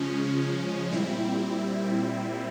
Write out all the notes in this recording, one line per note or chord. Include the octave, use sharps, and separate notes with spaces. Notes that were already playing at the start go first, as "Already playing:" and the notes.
Already playing: C#3 F3 G#3 C#4
A#2 G3 C4 E4